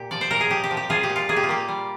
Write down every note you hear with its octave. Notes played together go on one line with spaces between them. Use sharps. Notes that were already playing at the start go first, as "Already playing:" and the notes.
Already playing: A#2 G4
F3 D5
C5
A#2 A#4
G#4
F3 G4
G4
F3
G4
F3 F4 G#4
G4
A#2
F4
A#3 G#4
G4
F4
A#3 G4
G3